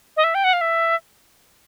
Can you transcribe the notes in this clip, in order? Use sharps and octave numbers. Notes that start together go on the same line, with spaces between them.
D#5
E5
G5
F#5
F5
E5